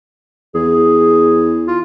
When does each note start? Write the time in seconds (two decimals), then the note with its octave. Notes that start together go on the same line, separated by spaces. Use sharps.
0.54 E2 G#4
1.67 F4